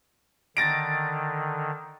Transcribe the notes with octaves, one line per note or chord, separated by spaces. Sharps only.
D3 D#3 A6 A#6 D7